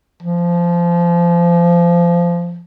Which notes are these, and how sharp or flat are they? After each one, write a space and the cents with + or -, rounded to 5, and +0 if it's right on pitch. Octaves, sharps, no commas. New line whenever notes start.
F3 -20